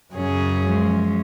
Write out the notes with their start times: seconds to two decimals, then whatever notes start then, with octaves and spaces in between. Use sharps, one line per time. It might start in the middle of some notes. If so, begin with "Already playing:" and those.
0.13 F#2 C#3 F#3 C#4 G#4
0.64 F3 G#3 C#4